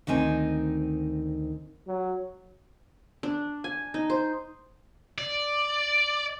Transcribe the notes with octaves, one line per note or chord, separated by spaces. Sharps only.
D2 D#3 C4 D#4 G#5
F#3
D4
G#5
D#4
C5
D5